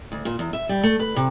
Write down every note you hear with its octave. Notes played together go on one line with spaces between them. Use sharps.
D2
A#2
E2
E5
G3
A3
B4
C3